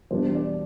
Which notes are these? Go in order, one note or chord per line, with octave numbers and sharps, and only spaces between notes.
E2 B2 G3 D4 C5
D5